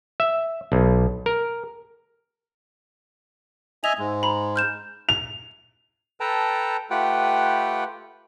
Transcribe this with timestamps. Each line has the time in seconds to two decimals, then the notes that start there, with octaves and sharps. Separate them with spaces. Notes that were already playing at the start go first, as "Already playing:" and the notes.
0.20 E5
0.72 B1
1.26 A#4
3.84 D#5 E5 G#5 F7
3.99 G#2 G#3
4.23 A#5 B5
4.56 F6 G6 E7
5.09 F7
6.20 A4 B4 G5 A5 A#5
6.90 A3 F4 G4 B4 F#5 G5